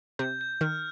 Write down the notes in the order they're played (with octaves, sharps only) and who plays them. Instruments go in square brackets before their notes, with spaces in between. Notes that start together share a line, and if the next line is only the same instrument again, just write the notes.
[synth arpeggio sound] C3 [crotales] G6
[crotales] G6
[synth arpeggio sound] D#3 [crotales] F6